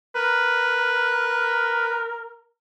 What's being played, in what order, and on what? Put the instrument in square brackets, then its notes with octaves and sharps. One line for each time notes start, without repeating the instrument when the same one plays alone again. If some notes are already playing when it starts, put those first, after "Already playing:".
[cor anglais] A#4 [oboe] B4